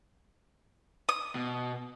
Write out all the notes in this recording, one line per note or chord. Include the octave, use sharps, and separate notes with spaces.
D#6
B2